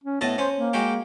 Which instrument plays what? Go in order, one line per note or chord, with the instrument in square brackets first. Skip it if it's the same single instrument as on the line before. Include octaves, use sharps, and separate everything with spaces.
[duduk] C#4
[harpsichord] A2 D#5 A5 [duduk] B3
[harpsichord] C#4 [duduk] C5
[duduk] A#3
[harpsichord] G#3 F#4 G4